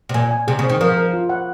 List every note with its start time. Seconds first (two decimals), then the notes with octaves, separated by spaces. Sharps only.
0.09 C3
0.14 A#2 G#5
0.31 G#5
0.48 C3 G#4
0.59 C#3
0.63 C5
0.69 D#3
0.81 F3 A#4
0.98 A#4
1.13 F4
1.29 F#5